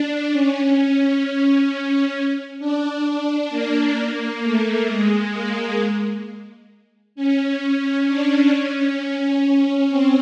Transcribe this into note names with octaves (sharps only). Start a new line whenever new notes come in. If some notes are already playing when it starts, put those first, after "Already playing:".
Already playing: D4
C#4
C#4
C#4
D4
D4
A#3
A3
G#3
A#3
C#4
D4
C#4
C#4
C4